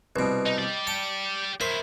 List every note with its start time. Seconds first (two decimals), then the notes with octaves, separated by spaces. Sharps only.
0.16 C2 B2 B4 D7
0.46 D#4 D#5
0.58 G4 D5
0.87 A5 C#7
1.61 F#3 E4 A#4 C5